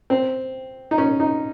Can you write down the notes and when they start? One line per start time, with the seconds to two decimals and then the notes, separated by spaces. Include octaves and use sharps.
0.10 C4
0.91 D#4
0.98 C#4
1.20 D#4